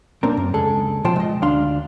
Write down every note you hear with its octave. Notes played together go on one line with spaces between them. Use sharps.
B1 A#3 C4 D4 A#4
F#2
C#2 G#3 G#4 A4
B1 F3 F4 C5 G5 A5
G#3 D#5
D2 D4 F5 C6